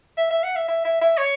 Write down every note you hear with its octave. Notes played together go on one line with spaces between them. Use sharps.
E5
E5
F#5
E5
E5
E5
E5
C#5